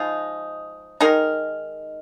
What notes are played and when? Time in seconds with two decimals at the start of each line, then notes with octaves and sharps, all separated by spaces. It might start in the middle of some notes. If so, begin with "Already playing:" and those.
Already playing: F3 G#3 D#4
1.01 D#3 G#3 D#4 A#4